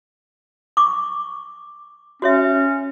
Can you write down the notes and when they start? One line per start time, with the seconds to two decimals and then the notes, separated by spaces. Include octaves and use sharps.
0.77 C#6 D6
2.22 C#4 F#4 C#5 E5